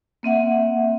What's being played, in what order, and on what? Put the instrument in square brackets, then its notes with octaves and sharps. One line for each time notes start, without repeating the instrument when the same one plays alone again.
[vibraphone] A#3 C4 E5 F#5